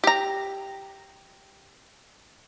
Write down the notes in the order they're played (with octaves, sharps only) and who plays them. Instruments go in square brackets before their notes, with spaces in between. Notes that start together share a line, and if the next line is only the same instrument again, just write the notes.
[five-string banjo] G4 A#5